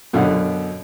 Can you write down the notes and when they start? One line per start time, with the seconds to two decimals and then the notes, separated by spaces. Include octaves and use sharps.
0.13 F#2 B2 D3 C#4 F5 F#5